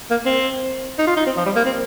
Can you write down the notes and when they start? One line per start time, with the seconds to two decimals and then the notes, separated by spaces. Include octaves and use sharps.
0.11 A#3
0.26 C4
0.99 D#4
1.07 F4
1.17 D#4
1.26 C4
1.37 F3
1.46 G3
1.56 A#3
1.65 C4